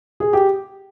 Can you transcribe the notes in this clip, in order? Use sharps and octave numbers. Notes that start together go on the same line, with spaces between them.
G#4
G4